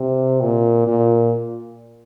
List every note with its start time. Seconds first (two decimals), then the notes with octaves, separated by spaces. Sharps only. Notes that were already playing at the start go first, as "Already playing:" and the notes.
Already playing: C3
0.41 A#2
0.88 A#2